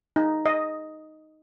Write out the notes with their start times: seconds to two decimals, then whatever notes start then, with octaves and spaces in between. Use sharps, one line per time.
0.16 D#4
0.46 D#5